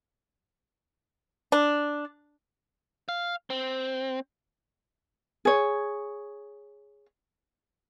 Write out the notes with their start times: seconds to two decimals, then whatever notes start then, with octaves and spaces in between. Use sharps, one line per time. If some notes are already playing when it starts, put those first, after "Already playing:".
1.52 D4
3.09 F5
3.50 C4
5.45 G#4 C#5